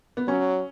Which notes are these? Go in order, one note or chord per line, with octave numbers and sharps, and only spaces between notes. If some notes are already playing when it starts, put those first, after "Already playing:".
B3
F#3 C#4